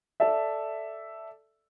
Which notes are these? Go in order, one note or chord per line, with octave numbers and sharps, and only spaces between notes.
A4 D5 E5